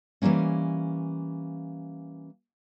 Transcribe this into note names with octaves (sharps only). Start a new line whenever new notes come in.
E3 F3 G3 A#3 C#4